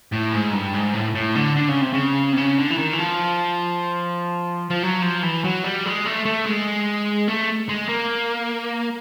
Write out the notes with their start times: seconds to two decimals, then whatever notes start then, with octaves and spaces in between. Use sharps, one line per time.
0.13 A2
0.33 G#2
0.54 G2
0.74 G#2
0.94 A2
1.15 A2
1.35 D3
1.56 D3
1.68 C#3
1.82 C3
1.93 C#3
2.33 C3
2.37 C#3
2.58 D3
2.70 E3
2.78 D#3
2.93 E3
2.99 F3
4.71 F3
4.83 F#3
5.03 F3
5.23 E3
5.44 F#3
5.64 G3
5.85 G#3
6.06 A3
6.26 A3
6.46 G#3
7.28 A3
7.69 G#3
7.89 A#3